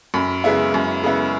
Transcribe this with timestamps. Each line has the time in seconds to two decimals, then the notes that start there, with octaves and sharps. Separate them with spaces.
0.14 F#2 B5
0.44 C#3 G#3 B3 E4
0.74 F#2
1.04 C#3 G#3 B3 E4